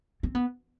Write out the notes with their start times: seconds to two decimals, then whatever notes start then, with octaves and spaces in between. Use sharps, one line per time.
0.23 C4
0.35 B3